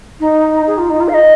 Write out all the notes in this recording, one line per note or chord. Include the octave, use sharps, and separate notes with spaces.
D#4
G#4
F4
D#4
F4
F5
D#5